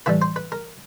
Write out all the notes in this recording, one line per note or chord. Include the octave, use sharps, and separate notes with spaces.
A2 E3 G3 B4
C5
B4
A#4